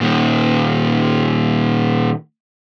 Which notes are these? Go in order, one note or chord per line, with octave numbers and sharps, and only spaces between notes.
A#2 D#3